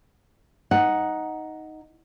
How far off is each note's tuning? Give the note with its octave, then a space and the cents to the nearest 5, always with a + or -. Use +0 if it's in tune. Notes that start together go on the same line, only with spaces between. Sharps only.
D#4 +5 F#5 +0